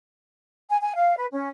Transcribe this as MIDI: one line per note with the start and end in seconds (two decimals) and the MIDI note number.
0.69 0.78 80
0.80 0.95 80
0.96 1.15 77
1.17 1.27 71
1.31 1.49 61